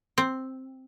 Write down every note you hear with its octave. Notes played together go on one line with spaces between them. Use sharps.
C4